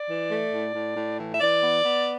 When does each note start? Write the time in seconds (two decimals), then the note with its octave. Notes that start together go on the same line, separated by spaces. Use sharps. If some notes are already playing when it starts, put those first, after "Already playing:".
Already playing: D5
0.09 E3
0.31 A3
0.52 A2
0.75 A2
0.96 A2
1.18 E3
1.32 E5
1.41 E3 D5
1.62 B3
1.84 B3